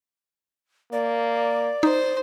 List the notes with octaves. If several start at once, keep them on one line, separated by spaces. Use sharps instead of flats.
A#3 D5
D#4 C5